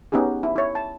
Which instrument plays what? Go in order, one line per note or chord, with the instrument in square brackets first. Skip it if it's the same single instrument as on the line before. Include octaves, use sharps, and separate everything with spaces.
[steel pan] B3 C#4 D#4 G4 G#4
E4
E4 C#5
A5